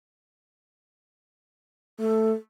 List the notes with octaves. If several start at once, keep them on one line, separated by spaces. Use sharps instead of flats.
A3 A4